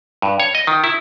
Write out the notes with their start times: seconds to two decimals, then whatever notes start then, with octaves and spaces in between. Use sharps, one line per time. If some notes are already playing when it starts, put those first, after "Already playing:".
0.22 G2
0.40 C#5
0.55 D#5
0.67 D#3
0.84 E4